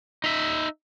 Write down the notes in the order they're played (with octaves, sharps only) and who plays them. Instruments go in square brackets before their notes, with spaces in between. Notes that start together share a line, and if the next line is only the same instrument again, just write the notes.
[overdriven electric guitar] D#4 E5